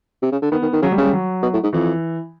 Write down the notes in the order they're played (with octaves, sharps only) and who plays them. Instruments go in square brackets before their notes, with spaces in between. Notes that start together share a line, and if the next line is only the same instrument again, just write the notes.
[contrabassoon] C3
C#3
D3
[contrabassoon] D#3 [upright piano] B3
[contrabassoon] D#3
D#3
[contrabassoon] C#3 [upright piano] F#3
[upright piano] G3
[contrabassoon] C#3
[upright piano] G3
F#3
[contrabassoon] B2
A2
G#2
[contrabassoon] F2 [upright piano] E3